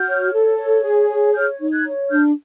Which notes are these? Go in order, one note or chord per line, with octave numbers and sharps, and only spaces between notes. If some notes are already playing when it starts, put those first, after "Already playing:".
Already playing: F#4 F6 G6
C#5
A4
C#5
G#4
C#5
C#5 F6 G6
D#4
F#6 G#6
C#5
D4 F6 G6